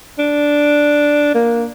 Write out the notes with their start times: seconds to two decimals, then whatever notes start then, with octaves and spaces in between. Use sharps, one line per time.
0.19 D4
1.34 A#3